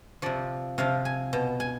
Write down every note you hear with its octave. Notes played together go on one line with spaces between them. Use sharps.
C3 F3 D5
C3 F3 F5
G#5
B2
G#5